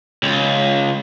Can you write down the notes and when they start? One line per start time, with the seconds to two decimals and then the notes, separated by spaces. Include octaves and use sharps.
0.23 C#2